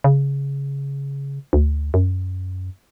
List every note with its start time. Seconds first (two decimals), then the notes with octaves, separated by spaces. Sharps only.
0.04 C#3
1.53 D2
1.94 F#2